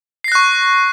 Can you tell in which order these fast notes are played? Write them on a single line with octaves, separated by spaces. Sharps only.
C7 A#6 F#6 C#6